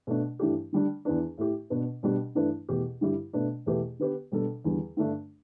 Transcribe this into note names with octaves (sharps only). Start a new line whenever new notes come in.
B2 A3 D4
G2 E3 A3 D4 G4
D3 G3 D4
E2 E3 B3 D4
A2 A3 E4 G4
B2 B3 D4 B4
B2 G3 D4 G4
G2 E3 A3 D4 B4
E2 B2 A3 G4
G2 D3 G3 E4 G4
B2 A3 D4 B4
E2 B2 A3 G4 B4
D3 B3 G4 B4
B2 G3 D4 A4
E2 D3 G3
G2 D3 A3 D4